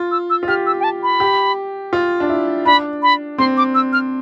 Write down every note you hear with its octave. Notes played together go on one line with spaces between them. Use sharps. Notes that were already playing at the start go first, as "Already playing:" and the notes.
Already playing: F4
E6
E6
F4
G4 F6
E6
G5
A5
B5
G4
F4
D4
E4
D4 B5
B5
C4 C6
D6
E6
F6